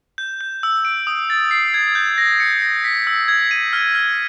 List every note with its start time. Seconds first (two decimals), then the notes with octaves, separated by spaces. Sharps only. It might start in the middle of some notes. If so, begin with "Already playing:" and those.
0.18 G6
0.41 G6
0.63 E6
0.85 D7
1.07 D#6
1.30 A6
1.51 C7
1.74 G#6
1.95 G6
2.18 A#6
2.40 C#7
2.62 A#6
2.84 B6
3.07 E6
3.28 G#6
3.51 D#7
3.73 F6
3.95 F6